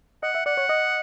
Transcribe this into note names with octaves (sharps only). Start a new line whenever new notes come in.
D#5 F#5
E5
D5 F#5
C#5
D#5